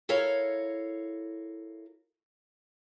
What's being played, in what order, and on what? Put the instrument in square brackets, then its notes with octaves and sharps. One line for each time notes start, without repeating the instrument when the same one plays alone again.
[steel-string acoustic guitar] E4 A4 A#4 C#5 F5